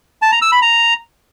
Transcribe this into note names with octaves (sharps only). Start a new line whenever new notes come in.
A5
A#5
E6
B5
A#5